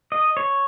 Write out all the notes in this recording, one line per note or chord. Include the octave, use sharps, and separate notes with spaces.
D#5
C#5